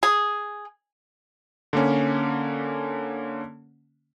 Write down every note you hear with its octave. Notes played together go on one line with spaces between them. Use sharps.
G#4
D3 A#3 C#4